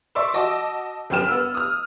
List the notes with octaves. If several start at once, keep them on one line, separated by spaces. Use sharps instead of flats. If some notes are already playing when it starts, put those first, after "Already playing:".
D5 E5 C6 C#6 E6
F#4 D#5 A5 D6
G1 F#2 B3 G5 F6 E7
B3 E6
D#6 F6